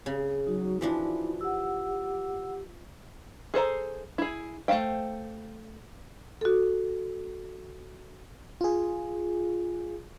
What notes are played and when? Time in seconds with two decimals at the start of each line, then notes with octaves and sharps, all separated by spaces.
0.06 C#3
0.47 F#3 D#4 F#4
0.81 E3 F3 D4 E4
1.41 G4 F#5 E6
3.54 G#4 A4 C5 A#5
4.18 E4 G#4
4.68 A3 G#4 C5 F5 G5
6.41 F#4 A4
8.61 F4 G#4